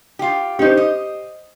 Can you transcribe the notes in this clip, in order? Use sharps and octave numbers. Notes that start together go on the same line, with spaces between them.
F4 G4
C#4 D#4 G4 C5
D#5